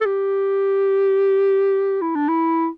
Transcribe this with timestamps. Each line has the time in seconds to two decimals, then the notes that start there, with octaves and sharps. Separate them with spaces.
0.01 A4
0.06 G4
2.01 E4
2.15 D4
2.29 E4